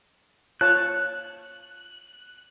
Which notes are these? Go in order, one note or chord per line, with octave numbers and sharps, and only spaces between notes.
F4 C#5 A5 F#6